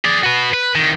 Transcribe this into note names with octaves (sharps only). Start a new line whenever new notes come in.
G#4 D5
F#4 B4
B4
C2 D#3